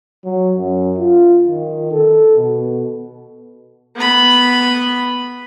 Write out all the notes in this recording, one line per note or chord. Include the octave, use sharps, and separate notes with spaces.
F#3
F#2
F4
D#3
A4
B2
B3 B5